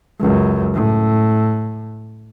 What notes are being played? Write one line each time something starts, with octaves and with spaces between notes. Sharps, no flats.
C#2 F#2
A2